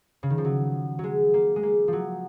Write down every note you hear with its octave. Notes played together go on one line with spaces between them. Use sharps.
C#3
D#3
F3
F#3
F#3 G#3
A#3
G#3
A#3
F3 F#3